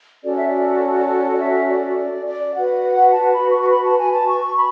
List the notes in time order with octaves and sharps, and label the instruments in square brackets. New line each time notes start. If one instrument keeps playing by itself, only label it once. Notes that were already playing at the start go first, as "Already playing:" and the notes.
[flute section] C#4 F#4 A4 D5
E5
D5
D5
E5
D5
D5
D5
F#4 B4 F#5
A5
B5
C#6
C#6
B5
A5
G#5
A5
C#6
B5